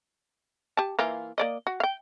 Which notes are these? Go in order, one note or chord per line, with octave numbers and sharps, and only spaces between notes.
G4 A5
E3 A#3 F4
A#3 D5 D#5
F#4
F5 G5